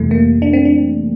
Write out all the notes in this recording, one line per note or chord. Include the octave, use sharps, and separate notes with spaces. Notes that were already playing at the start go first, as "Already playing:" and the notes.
Already playing: F2 C3 E3 G3 A3
A#3
D4
C4
D4